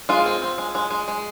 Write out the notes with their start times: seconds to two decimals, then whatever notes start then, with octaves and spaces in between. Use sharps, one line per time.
0.09 G#3 F4
0.26 C4
0.42 C4
0.58 G#3
0.75 G#3
0.91 G#3
1.08 G#3